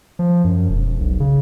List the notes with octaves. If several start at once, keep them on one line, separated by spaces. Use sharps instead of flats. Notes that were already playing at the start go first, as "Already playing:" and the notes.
F3
F#2
E1
B1
C#3